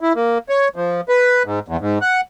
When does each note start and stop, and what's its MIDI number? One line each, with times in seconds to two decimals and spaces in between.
0.01 0.13 64
0.16 0.38 58
0.49 0.68 73
0.76 1.01 53
1.09 1.43 71
1.46 1.59 44
1.68 1.77 40
1.80 1.98 44
2.01 2.21 78